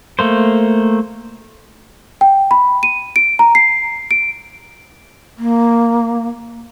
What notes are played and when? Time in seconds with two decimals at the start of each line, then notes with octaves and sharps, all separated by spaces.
0.19 A3 A#3 C5
2.21 G5
2.51 B5
2.83 D#7
3.16 D7
3.39 A#5
3.55 C7
4.11 D7
5.38 A#3